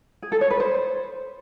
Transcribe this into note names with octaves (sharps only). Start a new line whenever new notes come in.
G#4
A4
C#5
B4
C5